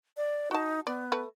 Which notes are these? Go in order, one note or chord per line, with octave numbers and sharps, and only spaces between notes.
D5
D#4 F#4 A5
B3 D5
A3 B4